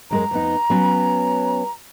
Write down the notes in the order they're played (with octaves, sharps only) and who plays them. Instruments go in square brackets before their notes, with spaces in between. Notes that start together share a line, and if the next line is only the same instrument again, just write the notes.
[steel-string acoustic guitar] F#2 G#3 A#4 [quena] A#5
[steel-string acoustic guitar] F2 B3 D#4
F#3 B3 C#4